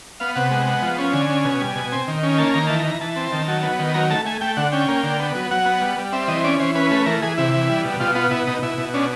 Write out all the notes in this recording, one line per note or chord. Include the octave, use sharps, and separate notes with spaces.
B3 F5
C3 F#5
G#3
B3
F3
C#4
D3 G#5
C#4
B2
G3
B2
C4
D#3
C#4
A#3 A5
D#3 A#5
E3 A5
A#5
E3
E3 A5
C4
D#3
F#3
B3
D#3
F#3 A#5
A3 A5
A3 G#5
A3 G5
D3 F#5
C#4 G5
A#3
D3
B3
F#3
F#3 F#5
B3
G3
G3
C4 E5
E3 D#5
C#4 D5
E3 C5
C#4 B4
A3 B4
E3 A#4
E3 G#4
C3 E4
E3
G3
B2
B2 F4
B3 F4
B2 E4
B2 D#4
B2 E4
B2
C#4 D4